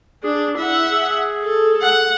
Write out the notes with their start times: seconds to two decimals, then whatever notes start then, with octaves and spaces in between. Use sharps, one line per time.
0.24 D4 G#4
0.57 E4 E5 F#5
0.90 G#4
1.43 A4
1.82 F#5